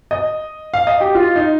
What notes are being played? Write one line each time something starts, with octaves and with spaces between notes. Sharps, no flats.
D#5
F5
D#5
G4
F4
D#4